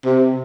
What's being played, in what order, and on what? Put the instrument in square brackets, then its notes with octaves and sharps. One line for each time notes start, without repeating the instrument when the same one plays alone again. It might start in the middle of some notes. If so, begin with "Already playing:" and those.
[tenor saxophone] C3